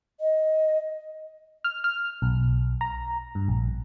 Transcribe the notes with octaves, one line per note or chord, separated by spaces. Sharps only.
D#5
F6
F6
B1
A#5
G2
A#1